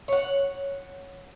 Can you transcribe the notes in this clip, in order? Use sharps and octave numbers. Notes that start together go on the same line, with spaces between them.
C#5 F#5